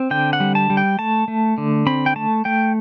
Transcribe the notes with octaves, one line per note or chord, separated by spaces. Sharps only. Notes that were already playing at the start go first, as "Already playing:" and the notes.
Already playing: C4
D3 G5
F#5
G3
A5
G3
G5
A3 A5
A3
D3
C4 B5
G5
A3 A5
A3 G5